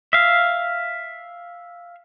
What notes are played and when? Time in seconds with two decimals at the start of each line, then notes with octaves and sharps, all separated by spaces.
0.13 E5 F5